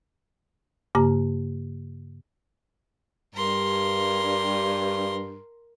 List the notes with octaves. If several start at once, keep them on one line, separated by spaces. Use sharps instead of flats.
G2 C#3 A#3 G4 A#5
G2 A#4 C6